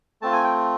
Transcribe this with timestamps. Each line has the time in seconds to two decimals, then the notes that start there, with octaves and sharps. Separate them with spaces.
0.22 A3 C4 F4 A5
0.33 G#5
0.44 G5